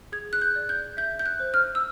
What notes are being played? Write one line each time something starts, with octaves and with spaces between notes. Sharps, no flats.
G#4 G#6
F#6
G6
D5
G6
E5 G6
G6
F#6
C5
F6
E6